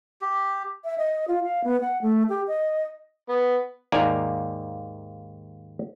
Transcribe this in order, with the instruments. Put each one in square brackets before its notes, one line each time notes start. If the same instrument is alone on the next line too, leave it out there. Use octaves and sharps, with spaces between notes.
[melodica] G4
[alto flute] E5
D#5
F4
F5
B3
F#5
A3
G4
D#5
[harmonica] B3
[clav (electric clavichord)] D#2 G#2 A#3 D5 G#5 A#5